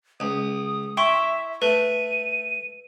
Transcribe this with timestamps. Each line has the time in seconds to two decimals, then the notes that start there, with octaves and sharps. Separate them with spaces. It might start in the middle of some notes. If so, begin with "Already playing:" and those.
0.20 C#2 D#6
0.97 E4 E5 G5 C6 C#6
1.62 A3 B4 D#7